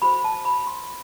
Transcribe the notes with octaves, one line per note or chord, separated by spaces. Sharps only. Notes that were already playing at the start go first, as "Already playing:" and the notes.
F#4 A4 C5 B5
A5
B5
C6